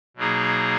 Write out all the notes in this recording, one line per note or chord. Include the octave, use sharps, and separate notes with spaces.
B2 F#3 A#3 D#4 G#4